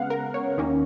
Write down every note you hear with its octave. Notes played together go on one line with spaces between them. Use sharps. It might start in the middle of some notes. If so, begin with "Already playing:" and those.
Already playing: C#3 G#3 B3 F5 F#5
A#4
C#5
D#2 D#3 A#3 C#4